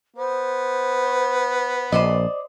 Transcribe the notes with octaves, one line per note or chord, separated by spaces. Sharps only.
B3 C5
A#1 C5 D5 D#5